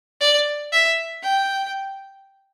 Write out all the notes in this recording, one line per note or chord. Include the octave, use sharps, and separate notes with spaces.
D5
E5
G5